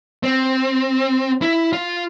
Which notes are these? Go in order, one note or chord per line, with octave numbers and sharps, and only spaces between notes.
C4
E4
F4